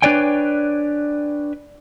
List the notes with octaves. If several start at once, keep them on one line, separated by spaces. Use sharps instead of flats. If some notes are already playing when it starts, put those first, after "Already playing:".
D4 B4 C#5 D5 G5 G#5